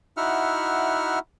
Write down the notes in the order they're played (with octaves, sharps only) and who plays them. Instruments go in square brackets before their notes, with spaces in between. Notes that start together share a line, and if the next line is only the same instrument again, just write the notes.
[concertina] D#4 E4 F#4 E5 F#5 F6